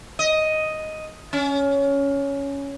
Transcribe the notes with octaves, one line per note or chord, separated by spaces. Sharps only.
D#5
C#4